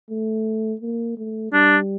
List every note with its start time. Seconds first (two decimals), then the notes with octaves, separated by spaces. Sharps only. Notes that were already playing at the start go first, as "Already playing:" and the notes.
0.10 A3
0.81 A#3
1.18 A3
1.52 G3 D4